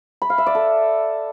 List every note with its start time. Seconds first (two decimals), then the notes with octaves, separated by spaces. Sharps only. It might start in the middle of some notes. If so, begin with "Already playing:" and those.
0.22 B5
0.30 F5
0.38 E5
0.46 D5
0.55 A4